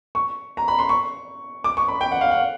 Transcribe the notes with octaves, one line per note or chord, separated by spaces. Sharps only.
C#6
A#5
B5
C6
C#6
D6
C#6
B5
G5
F#5
F5
F#5